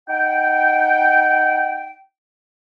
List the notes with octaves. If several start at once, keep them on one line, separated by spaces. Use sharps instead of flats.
D#4 F#5 G5